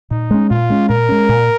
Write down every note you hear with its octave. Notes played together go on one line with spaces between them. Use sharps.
A#2 D#4
G#3 C#4
A#2 F4
G#3 C#4
A#2 A#4
G#3 C#4
A#2